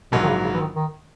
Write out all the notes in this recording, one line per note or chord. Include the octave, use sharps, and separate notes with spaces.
A#1 G#2 B2 F#3 A#3
D#3
C#3
C#3
E3
D#3
D#3